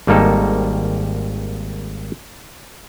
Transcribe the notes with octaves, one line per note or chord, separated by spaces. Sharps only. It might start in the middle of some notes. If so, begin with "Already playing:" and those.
G#1 G3 A#3 D#4 A4